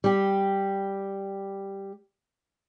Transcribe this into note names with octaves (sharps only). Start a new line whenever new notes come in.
G3 G4